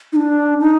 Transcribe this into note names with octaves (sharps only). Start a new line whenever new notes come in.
D#4
D4
D#4